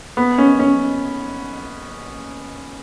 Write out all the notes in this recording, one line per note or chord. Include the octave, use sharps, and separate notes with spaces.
B3
C#4
C#4